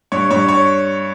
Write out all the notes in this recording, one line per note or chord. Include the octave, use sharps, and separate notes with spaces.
G2 C#5
G2 C#5
C#5